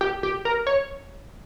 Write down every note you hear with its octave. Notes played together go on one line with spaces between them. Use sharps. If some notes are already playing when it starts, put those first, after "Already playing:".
G4
G4
A#4
C#5